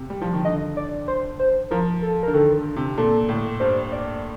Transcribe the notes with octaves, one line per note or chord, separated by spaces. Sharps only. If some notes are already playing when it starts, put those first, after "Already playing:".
Already playing: C3
G3
F3
D#3
D3 D#5
D5
C5
C5
F3 A#4
A4
D3 A#4
D#3 A4
C3
A#2 A4
A2
G2 C5
D5